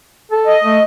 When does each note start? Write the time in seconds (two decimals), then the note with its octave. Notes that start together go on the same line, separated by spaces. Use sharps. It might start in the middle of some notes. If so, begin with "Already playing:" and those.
0.32 A4
0.47 D#5
0.64 A3